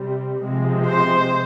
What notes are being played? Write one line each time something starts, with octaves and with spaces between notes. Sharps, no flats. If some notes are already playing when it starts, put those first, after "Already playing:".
Already playing: C3 G3 C4
C3 F3 G#3 C4
C5